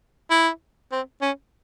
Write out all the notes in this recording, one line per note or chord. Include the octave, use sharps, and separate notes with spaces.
E4
C4
C#4